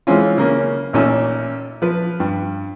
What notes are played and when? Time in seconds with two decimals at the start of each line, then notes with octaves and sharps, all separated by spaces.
0.07 E3 G#3 C4 C#4 F4
0.38 C#3 A#3 C#4
0.93 A1 A#2 C#4 D#4 E6
1.82 F3 B4
2.20 G2